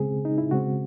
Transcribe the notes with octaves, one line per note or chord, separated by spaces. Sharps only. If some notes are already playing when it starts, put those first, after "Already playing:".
Already playing: C#3 G#3 C4 G#4
D#4
E4
C#3 G#3 C4 F#4